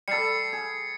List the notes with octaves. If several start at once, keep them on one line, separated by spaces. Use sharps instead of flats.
G3 A4 A6 C7 C#7
G#4